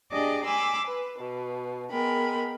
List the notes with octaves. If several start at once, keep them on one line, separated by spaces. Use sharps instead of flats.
D4 G4 G#4 D#5 D6
G#5 B5 C6 D6 E6
B4
B2
G#3 B3 A#4 G5 B5